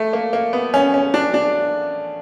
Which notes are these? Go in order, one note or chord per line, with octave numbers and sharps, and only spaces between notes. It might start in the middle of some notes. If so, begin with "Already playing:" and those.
Already playing: A3
A#3
A#3
B3
C#4
C#4
D4
D4